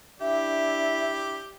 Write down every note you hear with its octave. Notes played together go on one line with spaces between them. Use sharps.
D4 E4 G4 E5